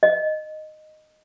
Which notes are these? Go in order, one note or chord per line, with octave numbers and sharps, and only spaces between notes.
D#5